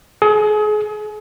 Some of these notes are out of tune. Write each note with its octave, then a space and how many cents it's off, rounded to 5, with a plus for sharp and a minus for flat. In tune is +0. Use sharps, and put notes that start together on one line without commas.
G#4 +35